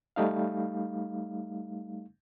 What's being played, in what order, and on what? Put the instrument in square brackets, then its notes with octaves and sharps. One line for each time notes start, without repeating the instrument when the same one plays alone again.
[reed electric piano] G3 A3 D#4 F5